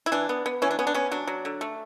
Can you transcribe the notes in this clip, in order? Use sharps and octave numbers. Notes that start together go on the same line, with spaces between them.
E4
E3 D4
B3
B3
E3 C#4
D4
B3 C#4
D4
B3 C#4
F#3 D4
F#3
D3
A3